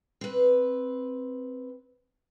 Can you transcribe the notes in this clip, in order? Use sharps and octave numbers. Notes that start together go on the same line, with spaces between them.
C4 B4